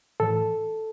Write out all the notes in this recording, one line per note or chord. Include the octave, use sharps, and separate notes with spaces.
A2 E3 A4